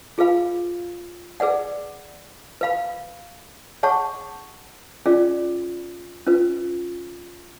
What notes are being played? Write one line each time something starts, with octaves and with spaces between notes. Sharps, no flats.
F4 G#4 B4 F5 B5
G#4 B4 D5 F#5
B4 F5 B5
G#4 C#5 F#5 A5 C#6
C#4 F4 G#4 D5
C#4 F4 B4